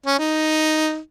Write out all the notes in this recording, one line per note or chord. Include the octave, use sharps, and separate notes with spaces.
C#4
D#4